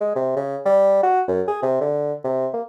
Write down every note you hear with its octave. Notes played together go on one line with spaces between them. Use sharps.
G#3
C3
C#3
G3
F#4
F#2
G#4
C3
D3
C3
A#3